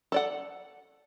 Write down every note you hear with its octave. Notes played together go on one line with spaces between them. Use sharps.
A4 D5 F#5